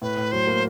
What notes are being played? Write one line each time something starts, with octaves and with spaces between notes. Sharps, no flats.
A2 B4
A2
F#3 C5
A#3